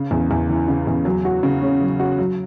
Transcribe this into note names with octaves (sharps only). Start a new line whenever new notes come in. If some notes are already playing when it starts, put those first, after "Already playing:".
Already playing: C#3
E2
E2
E3
C#3
E2
F#3
F#4
C#3
C#4
F#3
F#4
F#3